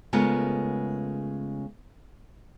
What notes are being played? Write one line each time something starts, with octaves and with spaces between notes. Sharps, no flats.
C#3 G#3 A3 B3 F4 A#4